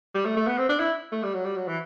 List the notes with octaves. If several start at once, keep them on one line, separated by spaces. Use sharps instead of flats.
G3
A3
A3
B3
C4
D4
E4
A3
G3
F#3
G3
F#3
E3